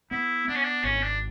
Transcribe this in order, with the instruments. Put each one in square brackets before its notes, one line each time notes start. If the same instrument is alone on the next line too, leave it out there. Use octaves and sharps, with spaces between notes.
[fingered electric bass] B3 [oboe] E4
[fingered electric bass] B3 [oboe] D4
[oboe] C#4
D4
[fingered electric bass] G#1 [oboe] C#4
[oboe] D4